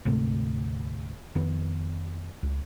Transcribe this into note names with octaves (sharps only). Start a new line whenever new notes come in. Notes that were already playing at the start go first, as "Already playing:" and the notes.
D2 G#2 C3 A3
F2 D#3 B3
C#2